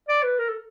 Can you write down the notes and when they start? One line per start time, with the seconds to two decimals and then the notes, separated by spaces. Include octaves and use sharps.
0.09 D5
0.23 B4
0.39 A#4
0.49 A4